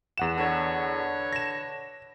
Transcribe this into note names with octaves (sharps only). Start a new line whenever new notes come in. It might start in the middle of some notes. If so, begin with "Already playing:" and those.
E2 F#5 E7
D3 B4 C#5
A#6 E7